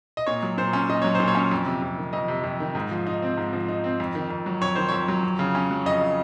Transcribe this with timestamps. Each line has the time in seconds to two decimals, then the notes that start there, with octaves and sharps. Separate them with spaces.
0.17 D#5
0.26 A#2 C#5
0.43 F#3
0.58 A#2 C5
0.73 C#4
0.90 A#2 D#5
1.02 F#3 C#5
1.15 C5
1.20 A#2
1.28 C#5
1.35 C#4
1.52 F2
1.66 C3
1.82 F2
1.98 D#3
2.13 F2 D#5
2.28 C3
2.44 F2
2.60 D#3
2.75 G#2
2.91 F3
3.07 D#4
3.22 C4
3.37 G#2
3.53 F3
3.68 D#4
3.84 C4
4.00 F2
4.15 D#3
4.30 F2
4.46 F#3
4.62 F2 C#5
4.75 D#3 C5
4.89 F2 C#5
5.08 F#3
5.23 F2
5.39 C#3
5.55 C#4
5.71 F#3
5.86 F2 D#5
6.01 C#3